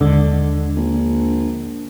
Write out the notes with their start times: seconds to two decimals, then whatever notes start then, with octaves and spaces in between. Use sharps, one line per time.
0.01 D#2 D3 G#3
0.77 A#1